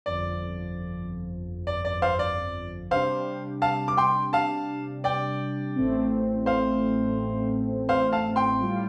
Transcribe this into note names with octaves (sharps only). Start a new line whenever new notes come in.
G1 F2 F3 D5
D5
D5
C5 F5
D5
C3 G3 D4 G4 C5 F5
F5 A5
D6
G5 C6
F5 A5
D5 G5
A1 A2 A3 C4
C5 F5
C5 F5
F5 A5
G5 C6
A2 G3 F4